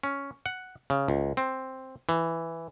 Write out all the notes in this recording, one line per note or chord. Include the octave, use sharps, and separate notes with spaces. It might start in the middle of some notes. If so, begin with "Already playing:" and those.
C#4
F#5
C#3
C#2
C4
E3